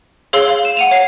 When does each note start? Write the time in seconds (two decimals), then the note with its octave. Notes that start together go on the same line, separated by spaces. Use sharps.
0.33 G#4 C#5 F5 C6 E6
0.48 F5
0.65 E7
0.77 F#5 D#7 F7
0.91 C#5 C7